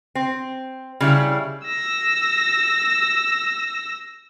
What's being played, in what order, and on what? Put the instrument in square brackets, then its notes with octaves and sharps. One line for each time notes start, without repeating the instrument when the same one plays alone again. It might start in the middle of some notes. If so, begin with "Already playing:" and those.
[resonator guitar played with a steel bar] C4
C#3 G3 E4
[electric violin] E6 A#6